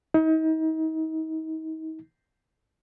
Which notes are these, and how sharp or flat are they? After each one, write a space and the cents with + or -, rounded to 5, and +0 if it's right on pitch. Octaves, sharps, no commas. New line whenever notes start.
D#4 +35